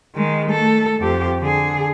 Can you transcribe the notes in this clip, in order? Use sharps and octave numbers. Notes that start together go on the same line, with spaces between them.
D#3 G#3
A3 A4
F2 G4
D3 G#4